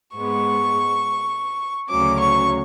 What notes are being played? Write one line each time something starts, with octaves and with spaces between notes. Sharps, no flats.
G#2 G#3 B3 C#6
D2 C#3 F#3 C#4 D6
C#6